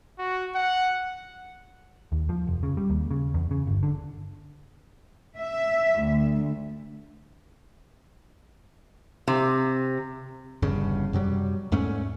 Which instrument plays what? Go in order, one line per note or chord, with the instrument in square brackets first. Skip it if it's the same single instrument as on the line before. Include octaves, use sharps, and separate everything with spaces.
[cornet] F#4
F#5
[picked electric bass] D#2
F3
F1
C#3
G3
D#2
C#3
E2
C#3
G1
D3
[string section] E5
D2
[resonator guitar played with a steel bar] C3
[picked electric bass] G1 E2 G2 C#3
F#2 C3 F#3 G3
E2 G#2 A3 C#4